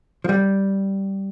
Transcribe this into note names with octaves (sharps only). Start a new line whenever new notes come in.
F3
G3